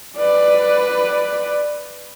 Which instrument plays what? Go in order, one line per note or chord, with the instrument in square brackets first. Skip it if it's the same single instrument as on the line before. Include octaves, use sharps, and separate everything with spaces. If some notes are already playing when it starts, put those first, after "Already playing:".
[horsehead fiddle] B4 D5